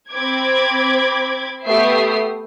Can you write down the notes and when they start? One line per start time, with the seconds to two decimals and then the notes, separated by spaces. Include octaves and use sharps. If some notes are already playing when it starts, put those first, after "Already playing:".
0.11 C4 B5 D6 G#6
1.66 A3 B3 G4 E5 D#6 C7